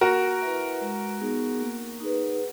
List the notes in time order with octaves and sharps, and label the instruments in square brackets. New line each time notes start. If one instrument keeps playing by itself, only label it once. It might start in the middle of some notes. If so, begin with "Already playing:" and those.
[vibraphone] A#3 [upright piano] F#4 A#4
[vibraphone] E4 B4 E5
G#3
B3 D#4 G#4
A#3
D#4 G#4 B4